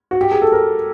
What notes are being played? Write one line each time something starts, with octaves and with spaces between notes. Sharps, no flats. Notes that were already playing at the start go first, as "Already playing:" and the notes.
F#4
G4
G#4
A4
A#4